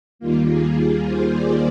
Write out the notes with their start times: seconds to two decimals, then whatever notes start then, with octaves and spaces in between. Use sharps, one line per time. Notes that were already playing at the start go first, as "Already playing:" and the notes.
0.19 D#2 D#3 G3 A#3 F4
0.48 G#4
0.77 G#4
1.04 C5
1.33 D5